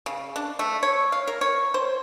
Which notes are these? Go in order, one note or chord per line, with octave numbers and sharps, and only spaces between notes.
C#3
D4
A3
C#5
F5
A#4
C#5
C5